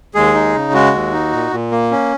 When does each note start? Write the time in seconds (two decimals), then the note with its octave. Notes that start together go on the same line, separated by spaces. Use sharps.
0.15 D#2 G#3 G#4
0.34 D#4
0.55 C#3
0.74 G#3 F#4
0.93 D#2
1.13 D#4
1.32 A#2
1.51 A#2
1.71 A#3
1.91 C#4